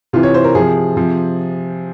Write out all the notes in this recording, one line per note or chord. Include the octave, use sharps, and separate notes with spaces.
C3 E3 F4
C#5
C5
A#4
C3 F3 G#4
C3 F3